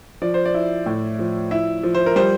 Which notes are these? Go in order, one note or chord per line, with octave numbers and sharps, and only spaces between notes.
F3 D5
C5
D5
E4
A2
F3
E4 E5
F3
C5
A#4
G3 C5